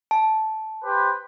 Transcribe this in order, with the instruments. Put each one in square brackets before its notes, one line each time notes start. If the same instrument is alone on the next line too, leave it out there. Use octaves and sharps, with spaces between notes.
[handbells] A5
[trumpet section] G4 B4 C5